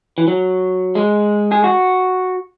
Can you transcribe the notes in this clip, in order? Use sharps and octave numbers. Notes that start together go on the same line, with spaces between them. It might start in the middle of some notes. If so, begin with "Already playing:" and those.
E3
F#3
G#3
G#4
F#4